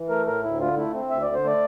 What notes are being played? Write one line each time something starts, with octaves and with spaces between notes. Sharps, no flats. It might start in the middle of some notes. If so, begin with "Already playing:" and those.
Already playing: E3
A3 A#4
A2 A#4
D2 E4
D3 F4
A3 E4
C4
D2 E5
D3 D5
C5
A3 D5